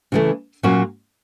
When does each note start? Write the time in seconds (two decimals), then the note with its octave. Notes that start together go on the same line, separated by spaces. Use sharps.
0.12 C#3 E3 A3
0.63 A#2 F#3 A#3 C#4 F#4